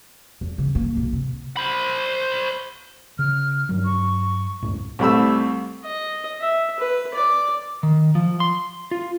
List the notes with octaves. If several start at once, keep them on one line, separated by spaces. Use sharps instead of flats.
E2
C#3
A#3
B1
C3
C5 B5
C#3 F6
G2 F#3
C#6
C#2 F#2 A2
C2 G3 A3 B5 E6
D#5
E5
B4
D5
D#3
F3
C6
F4